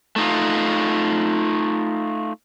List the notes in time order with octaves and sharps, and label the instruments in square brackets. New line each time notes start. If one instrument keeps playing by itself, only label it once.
[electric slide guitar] A3 D#4 F4